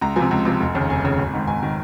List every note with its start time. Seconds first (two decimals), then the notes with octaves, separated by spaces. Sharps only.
0.01 C#2 A#5
0.16 C3 F3 G#5
0.31 C#2
0.45 C3 F3
0.60 F1
0.75 D#2 C#3
0.90 F1 G#5
1.04 D#2 C#3
1.18 G#1
1.33 G#2 D#3
1.47 G#1 G#5
1.63 D#3